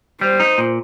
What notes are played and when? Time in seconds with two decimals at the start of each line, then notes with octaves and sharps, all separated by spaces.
0.21 G3 C5
0.40 D#4
0.58 A#2